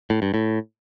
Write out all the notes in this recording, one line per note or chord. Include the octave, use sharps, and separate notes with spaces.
A2
G2
A2